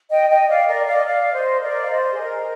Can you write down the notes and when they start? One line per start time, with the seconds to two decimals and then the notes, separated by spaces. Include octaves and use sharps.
0.10 D#5 G5
0.30 D#5 G5
0.48 D5 F5
0.67 A#4 D5
0.86 D5 F5
0.97 D#5
1.05 D5 F5
1.33 C5 D#5
1.62 A#4 D5
1.82 F5
1.91 C5 D#5
2.13 G#4
2.19 A#4